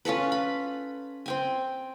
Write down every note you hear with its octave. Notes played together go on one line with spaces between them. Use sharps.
C#4 F4 A4 B4
B5
C4 G5 G#5